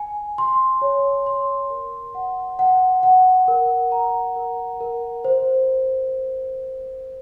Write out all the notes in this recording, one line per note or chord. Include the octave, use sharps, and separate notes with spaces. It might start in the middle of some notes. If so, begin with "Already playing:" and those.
Already playing: G#5
C6
C#5
C6
A#4
F#5
F#5
F#5
A#4
A#5
A#4
A#4
C5